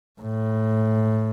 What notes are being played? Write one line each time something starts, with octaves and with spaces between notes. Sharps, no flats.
A2